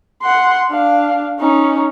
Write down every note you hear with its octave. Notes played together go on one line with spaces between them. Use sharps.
F#5 C6
D4 F5
C#4 D#4